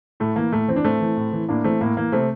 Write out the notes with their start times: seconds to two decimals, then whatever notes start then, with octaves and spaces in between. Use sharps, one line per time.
0.20 A2 A3
0.36 E3 A#3
0.52 A2 A3
0.68 E3 C4
0.76 D4
0.84 A2 A3 C4
1.01 E3
1.17 A2
1.33 E3
1.48 A2 A#3 D4
1.64 E3 A3 C4
1.81 A2 A#3
1.97 E3 A#3
2.12 C3 A3 C4